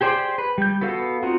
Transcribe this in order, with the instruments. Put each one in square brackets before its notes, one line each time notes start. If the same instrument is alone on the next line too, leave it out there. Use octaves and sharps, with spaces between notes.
[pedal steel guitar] G4 G#4 C5 D5 G5
B4
G3 G6
B3 F#4 A4 F5
C4 D#4 F4 F#4 F#5